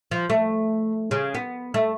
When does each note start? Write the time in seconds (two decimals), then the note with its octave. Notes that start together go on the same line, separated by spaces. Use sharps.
0.11 F3
0.30 A3
1.11 C#3
1.35 B3
1.74 A3